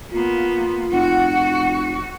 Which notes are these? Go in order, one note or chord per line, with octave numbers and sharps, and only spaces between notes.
A#3 B3 F4
F1 F#4 F#5